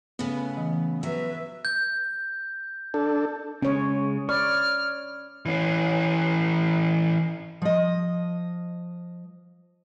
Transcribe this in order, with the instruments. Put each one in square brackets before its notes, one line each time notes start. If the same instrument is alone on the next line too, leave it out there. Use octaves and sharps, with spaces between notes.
[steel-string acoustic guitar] A2 C#3 [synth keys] B3
[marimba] E3
[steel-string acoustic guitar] F#3 [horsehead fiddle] B4 E5
[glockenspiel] G6
[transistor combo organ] D4 A4
[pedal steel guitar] C#3 G#3 [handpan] C#4 C#5
[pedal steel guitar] C#5 B5 C#6 [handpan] D5 [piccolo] F6
[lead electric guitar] E3 C#4
[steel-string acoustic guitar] F3 D#5